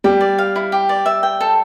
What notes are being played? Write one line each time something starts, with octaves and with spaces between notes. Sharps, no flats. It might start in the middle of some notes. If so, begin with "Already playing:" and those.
G3 G4
D5
F5
E4
G4
D5
E5
G5
A4